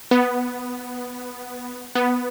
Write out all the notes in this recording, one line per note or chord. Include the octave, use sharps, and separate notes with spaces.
B3
B3